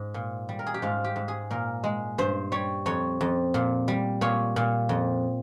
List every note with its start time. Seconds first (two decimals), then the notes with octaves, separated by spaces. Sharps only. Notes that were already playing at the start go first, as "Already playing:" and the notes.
Already playing: G#2
0.14 A#2
0.49 G3
0.59 A#4
0.67 G#4
0.74 G4
0.82 G#2 F4
1.04 G4
1.16 G#2
1.28 G#4
1.51 A#2 A#4
1.84 G#3
2.18 G2 C5
2.52 G3 C#5
2.86 F2 C#5
3.21 F2
3.54 A#2
3.88 G3
4.21 A#2 C#5
4.56 A#2
4.89 F2